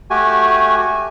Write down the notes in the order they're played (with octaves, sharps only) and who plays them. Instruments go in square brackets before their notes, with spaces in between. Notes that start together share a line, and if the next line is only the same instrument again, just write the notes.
[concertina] A3 F#4 G4 G#5